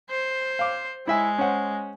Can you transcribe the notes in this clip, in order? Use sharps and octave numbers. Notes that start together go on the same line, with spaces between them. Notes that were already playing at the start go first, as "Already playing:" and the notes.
C5
F5 D6
G#3 E4 E5 G#5
C#4 C5 F#5